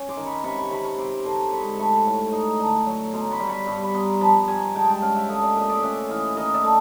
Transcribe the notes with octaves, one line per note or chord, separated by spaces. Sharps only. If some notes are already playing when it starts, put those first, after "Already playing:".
Already playing: C#4
C6 D6
D#3
B5 C#6
C3 B5 C#6
B5 C#6
C3 B5 C#6
B5 C#6
C4 C6 D6
D3 A#5 C6
G#2 B5 C#6
A3 B5 C#6
A2
D#4
D3
F#3
B2 A#5 C6
B5 C#6
G3
B5 C#6
G2 B5 C#6
B5
B3 A#5 C6
F3 A5 B5
G2 G#5 A#5
G#3 G5 A5
G5 A5
C#4 F5 G5
E5 F#5
A3 D#5 F5
D5 E5
A#2
D#5
D5 E5
C#4 E5 F#5
E3 D#5 F5
D#3 D#5 F5
D5 E5
A3